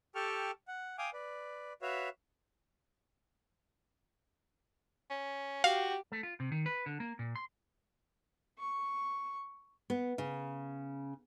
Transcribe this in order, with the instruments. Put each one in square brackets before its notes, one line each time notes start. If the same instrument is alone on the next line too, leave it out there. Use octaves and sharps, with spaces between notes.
[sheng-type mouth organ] G4 A4 G5 A5 C#6 F6
F#5
F5 G5 G#5 D6 D#6
B4 D5
F#4 B4 C#5 E5 F5
[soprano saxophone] C#4
[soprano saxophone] F#4 [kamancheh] G4 [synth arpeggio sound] F5
[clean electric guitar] A3
F4
C3
D#3
B4
D3
A#3
A#2
C6
[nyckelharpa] C#6
[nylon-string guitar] B3
C#3